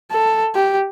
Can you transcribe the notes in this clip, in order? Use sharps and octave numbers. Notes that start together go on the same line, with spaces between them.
A4
G4